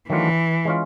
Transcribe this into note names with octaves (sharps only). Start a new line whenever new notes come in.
D#3 E3 F#3 A3 D4 F4
G#3 C#4 F4